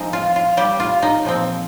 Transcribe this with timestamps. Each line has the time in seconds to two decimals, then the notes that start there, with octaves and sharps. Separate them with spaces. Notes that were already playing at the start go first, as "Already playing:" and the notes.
Already playing: F3 G#3 C4 D#4
0.13 F4
0.36 F4
0.57 G3 G4
0.80 F4
1.03 D#4
1.25 A#2 F3 C4